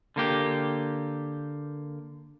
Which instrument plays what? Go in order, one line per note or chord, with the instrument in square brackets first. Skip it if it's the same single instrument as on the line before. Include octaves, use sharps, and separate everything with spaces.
[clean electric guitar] D3 A#3 G4